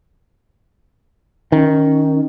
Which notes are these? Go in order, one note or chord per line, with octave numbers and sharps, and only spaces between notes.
D#3 C#4